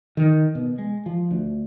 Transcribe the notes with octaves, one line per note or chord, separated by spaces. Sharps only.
D#3
B2
G#3
F3
D2